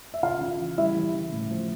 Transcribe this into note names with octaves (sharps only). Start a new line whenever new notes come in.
E5
C#3 F4 F5
C#3
E3
G3 E4 E5
E3
C#3
A2
F3